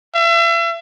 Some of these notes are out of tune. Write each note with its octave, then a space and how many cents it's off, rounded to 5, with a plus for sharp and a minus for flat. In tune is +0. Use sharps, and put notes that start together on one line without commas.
E5 +40